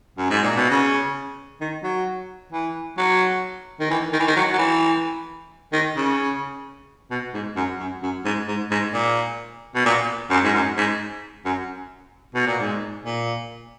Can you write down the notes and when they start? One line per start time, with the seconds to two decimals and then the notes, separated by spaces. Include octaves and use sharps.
0.18 F#2
0.30 G#2
0.43 A#2
0.56 B2
0.70 C#3
1.61 D#3
1.83 F#3
2.52 E3
2.98 F#3
3.80 D#3
3.91 E3
4.13 D#3
4.20 E3
4.27 D#3
4.36 F#3
4.53 F#3
4.58 E3
5.72 D#3
5.96 C#3
7.11 B2
7.34 G#2
7.56 F#2
7.79 F#2
8.03 F#2
8.25 G#2
8.48 G#2
8.71 G#2
8.93 A#2
9.75 B2
9.85 A#2
10.30 F#2
10.44 G#2
10.54 F#2
10.77 G#2
11.45 F#2
12.34 B2
12.47 A#2
12.60 G#2
13.05 A#2